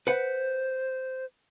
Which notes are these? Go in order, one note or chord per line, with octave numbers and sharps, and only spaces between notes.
B4 C5 F#5